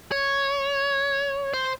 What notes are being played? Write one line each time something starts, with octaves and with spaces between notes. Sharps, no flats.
C#5
C5